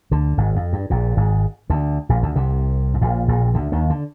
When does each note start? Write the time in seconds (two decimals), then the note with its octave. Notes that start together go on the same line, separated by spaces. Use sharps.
0.11 D2 D3
0.38 G#1 G#2
0.56 F2
0.73 G2
0.90 A#1 A#2
1.17 G#1 G#2
1.70 D2 D3
2.09 A#1 A#2
2.23 D2 D3
2.35 C2 C3
2.94 G#2
3.01 A#1 A#2
3.28 A#1 A#2
3.54 D2 D3
3.72 D#2 D#3
3.90 D3